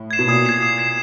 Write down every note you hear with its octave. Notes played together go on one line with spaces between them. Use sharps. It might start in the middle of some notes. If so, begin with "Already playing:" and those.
Already playing: A2
G#6 C7 E7
B2
A#2 D#6
G#6 C7 E7
D#6
G#6 C7 E7